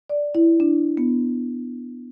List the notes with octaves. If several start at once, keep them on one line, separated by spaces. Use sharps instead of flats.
D5
E4
D4
B3